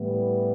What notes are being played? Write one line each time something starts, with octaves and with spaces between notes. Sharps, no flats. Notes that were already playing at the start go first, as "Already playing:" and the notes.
Already playing: A2 E3 G3 B3